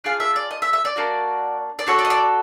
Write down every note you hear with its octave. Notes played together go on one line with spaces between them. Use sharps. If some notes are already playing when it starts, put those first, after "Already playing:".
D4 F4 G#4 F5
E5
D5
D#5
E5
E5
D5
A#3 D4 F#4
D5
D4 F#4 A4 C#5
D5
D#5
D5